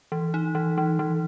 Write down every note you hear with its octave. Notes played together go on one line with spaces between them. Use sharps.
E3
D#4
E3
E3
E3